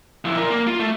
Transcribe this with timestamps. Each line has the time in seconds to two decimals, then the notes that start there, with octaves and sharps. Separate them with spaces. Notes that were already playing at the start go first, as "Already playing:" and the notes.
0.25 F3 E4
0.37 A#4 D5
0.50 A#3
0.67 F4
0.80 A3